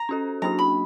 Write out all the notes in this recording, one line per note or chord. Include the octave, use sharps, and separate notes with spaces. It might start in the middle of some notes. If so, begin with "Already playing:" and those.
Already playing: A#5
C#4 F#4 A4
F#3 A#3 D4 F#4 A#5
B5